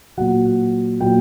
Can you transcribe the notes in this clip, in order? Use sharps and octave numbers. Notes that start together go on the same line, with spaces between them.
A#2 F#3 F#5
A#2 F#3 G5